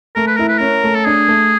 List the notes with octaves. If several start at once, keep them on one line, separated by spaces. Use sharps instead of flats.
A3 A#4
B4
E4 A#4
B4
C#4 A#4
A3
A4
D4 G#4
A3